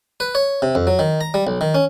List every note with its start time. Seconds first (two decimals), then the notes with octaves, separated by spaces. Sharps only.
0.20 B4
0.35 C#5
0.62 C3
0.75 F2
0.87 F#3
0.99 D#3
1.21 A#5
1.34 G3
1.47 B1
1.61 D#3
1.75 C#4